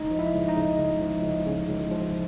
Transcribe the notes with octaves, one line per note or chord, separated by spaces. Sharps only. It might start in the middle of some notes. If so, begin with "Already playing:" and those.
Already playing: C#2 D#4 D#5
F3
E4 E5
C#2
D#4 D#5
C#3
C#2
F3
C#2
C#3
C#2
F3